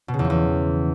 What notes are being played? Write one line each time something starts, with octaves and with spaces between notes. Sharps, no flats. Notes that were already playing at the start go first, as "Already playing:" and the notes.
B2
C#3
E2
F3
E2